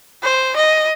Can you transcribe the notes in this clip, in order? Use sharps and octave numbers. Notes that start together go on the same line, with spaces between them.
C5
D#5